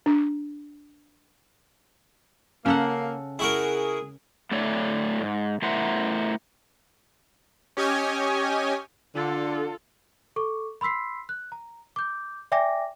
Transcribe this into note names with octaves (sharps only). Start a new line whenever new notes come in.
D4
C#3 A#3 A4 F#5
E4 F#4 G#4 A#4
A2 A3 D4 A4 C#5 D5
G#2
A3 E4 A#4 C5 E5 F#5
C#4 G4 C#5 D#5 G#5
D3 F4 A4
A4 C#6 D6
B5 C6 E6 B6 C7
F#6
A#5
D6 G6
D5 E5 G5 G#5 D6 A#6